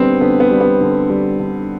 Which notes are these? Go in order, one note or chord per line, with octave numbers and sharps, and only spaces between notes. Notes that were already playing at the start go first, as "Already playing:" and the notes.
Already playing: D3 G3 B3 C4
D3 B3
B3
G3
B3
D3
G3
D3